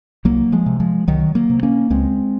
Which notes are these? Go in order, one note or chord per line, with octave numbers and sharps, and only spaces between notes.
C2 F#3 A#3
F3 G#3
C3
F3 G#3
C2 D#3 F#3
F#3 A#3
C3
A#3 C#4
C#2 G#3 C4